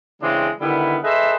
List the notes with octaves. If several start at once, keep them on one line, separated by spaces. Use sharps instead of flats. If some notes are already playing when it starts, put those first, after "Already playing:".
C#3 E3 G3 G#3 C4 D4
D3 D#3 G3 B3 E4
G#4 A4 B4 C5 D#5 E5